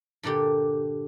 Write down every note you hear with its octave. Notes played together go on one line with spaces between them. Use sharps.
G2 A#2 D3 G4